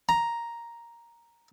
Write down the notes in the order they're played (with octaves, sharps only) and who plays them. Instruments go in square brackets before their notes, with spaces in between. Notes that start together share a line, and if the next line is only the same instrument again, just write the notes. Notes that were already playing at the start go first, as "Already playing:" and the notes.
[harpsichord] A#5